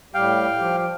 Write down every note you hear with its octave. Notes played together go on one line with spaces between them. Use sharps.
A2 G3 G4 F5 G5
F3 G4